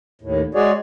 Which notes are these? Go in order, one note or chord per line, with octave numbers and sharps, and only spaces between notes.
D#2 A2
G#3 F#4 G#4 C#5 D5